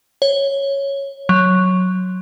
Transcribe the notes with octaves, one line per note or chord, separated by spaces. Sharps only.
C#5
F#3